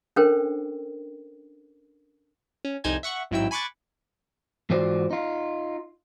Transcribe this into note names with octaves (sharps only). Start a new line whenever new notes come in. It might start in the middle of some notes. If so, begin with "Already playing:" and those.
C#4 D4 A4 A#4 C5 G5
C#4
C2 F2 D#4 C5 G#5 G#6
E5 F#5 C#6 F#6
A1 G#2 F#3 E4 G5 E6
G#5 B5 C#6 D6 F#6 A6
G#2 E3 F4 F#4 C5 D5
D#4 F4